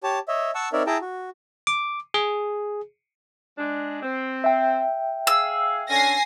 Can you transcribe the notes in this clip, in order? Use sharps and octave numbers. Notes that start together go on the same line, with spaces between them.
G4 C#5 A5
C#5 D#5 E5
F#5 A5 C#6 E6
C4 D#4 A#4 C#5 D5 E5
E4 G#4 G5 A5 A#5
F#4
D6
G#4
G#3 D4
C4
E5 G5
G#4 F5 E6
D3 C#4 G#5 A#6 C7